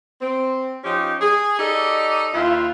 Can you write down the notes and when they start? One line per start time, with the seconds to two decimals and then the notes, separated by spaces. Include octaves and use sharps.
0.21 C4
0.84 F3 C#4 D#4 G4
1.21 G#4
1.59 D#4 G4 A4 D5 D#5
2.34 D#2 E4 F4